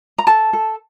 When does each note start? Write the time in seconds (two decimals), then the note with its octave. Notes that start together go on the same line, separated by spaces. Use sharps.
0.18 A#5
0.27 A4 A5
0.53 A4